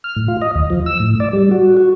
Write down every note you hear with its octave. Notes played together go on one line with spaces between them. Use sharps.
F6
A2
F4
D#5
D#2
F3
E6
A2
D5
G3
F#4
F#4